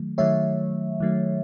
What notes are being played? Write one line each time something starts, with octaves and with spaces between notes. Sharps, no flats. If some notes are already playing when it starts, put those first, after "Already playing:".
Already playing: D#3 F#3 A3
D#3 F#3 A3 C#5 E5
D#3 F#3 A3